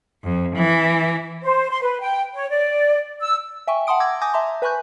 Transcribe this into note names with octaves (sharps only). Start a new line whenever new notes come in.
F2
E3
C5
C6
B4
G5
C#5
D5
E6
E5 G5 G#5 C#6
F#5 A5 C6 D#6 D7
D6 E6 G#6 A#6
G#5 D6 D#6 G6 A#6
E5 A5 A#5 C6
B4 G#5 B5 C#6 F#6 G6